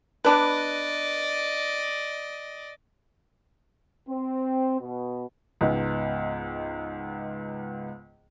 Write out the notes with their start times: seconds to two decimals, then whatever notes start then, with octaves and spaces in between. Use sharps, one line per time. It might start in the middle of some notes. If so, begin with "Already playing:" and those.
0.25 B3 D4 B4 D5 D#5
4.09 C4
4.80 B2
5.61 C#2 G#2 B3